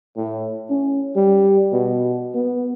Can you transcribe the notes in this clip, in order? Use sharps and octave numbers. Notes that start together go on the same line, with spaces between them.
A2
C#4
G3
B2
B3